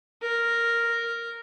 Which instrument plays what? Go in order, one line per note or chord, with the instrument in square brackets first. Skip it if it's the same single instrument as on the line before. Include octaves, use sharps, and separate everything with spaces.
[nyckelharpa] A#4